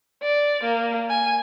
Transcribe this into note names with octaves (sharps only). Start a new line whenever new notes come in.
D5
A#3
G#5